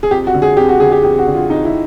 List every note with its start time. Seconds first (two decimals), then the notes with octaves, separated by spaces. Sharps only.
0.03 G#4
0.11 F2 G4
0.27 F#4
0.34 D3
0.42 G#4
0.57 F2 G4
0.69 F#4
0.80 D3 G#4
0.92 G4
1.03 F2 G4
1.19 F#4
1.27 D3
1.34 F4
1.50 F2 D#4
1.65 E4